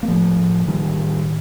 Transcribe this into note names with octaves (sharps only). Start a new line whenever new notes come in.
A#3
A2 F3 A3
A2
A2 D#3 G3
A2